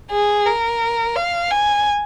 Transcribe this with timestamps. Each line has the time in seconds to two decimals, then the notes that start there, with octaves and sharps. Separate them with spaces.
0.11 G#4
0.46 A#4
1.16 F5
1.51 G#5